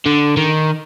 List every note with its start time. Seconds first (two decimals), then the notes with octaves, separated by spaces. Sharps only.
0.06 D3
0.37 D#3